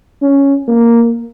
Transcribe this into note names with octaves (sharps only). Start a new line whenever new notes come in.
C#4
A#3